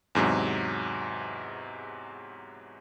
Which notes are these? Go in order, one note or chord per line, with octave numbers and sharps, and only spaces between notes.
E2 G#2 C3 F#3